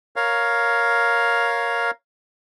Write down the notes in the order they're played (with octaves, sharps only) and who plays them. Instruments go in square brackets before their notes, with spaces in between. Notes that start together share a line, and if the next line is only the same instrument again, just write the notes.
[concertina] A#4 C#5 F5